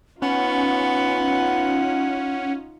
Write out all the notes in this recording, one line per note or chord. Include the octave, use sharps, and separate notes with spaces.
B3 C#4 D#4 F4 F#5